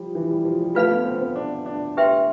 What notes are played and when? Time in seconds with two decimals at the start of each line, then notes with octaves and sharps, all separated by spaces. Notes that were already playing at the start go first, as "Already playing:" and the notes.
Already playing: F3 G3 F4
0.15 E3
0.30 G3
0.45 F3
0.61 G3
0.75 A3 F4 B4 F5 B5
0.91 B3
1.05 C4
1.15 B3
1.21 C4
1.36 D4
1.66 D4
1.97 G4 B4 E5 G5 C6